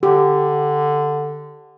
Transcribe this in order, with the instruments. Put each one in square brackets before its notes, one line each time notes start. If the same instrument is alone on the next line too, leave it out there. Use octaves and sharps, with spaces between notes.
[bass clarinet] D3 [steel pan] G4